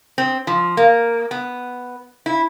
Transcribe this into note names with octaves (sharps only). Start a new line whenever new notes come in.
C4
F3
A#3
B3
E4